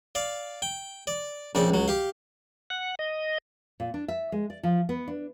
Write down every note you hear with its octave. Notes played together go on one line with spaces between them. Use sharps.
D5 F5
G5
D5
A#1 C#3 C4 D5
C#2 F#3
G4 F5
F#5
D#5
A#2
D4
E5
G#3
D5
F3
B3
D4